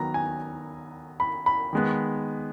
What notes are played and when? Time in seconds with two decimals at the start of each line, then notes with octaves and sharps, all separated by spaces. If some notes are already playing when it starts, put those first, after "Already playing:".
Already playing: D#3 F#3 B3 A#5
0.14 G#5
1.20 B5
1.46 B5
1.73 D#3 G#3 B3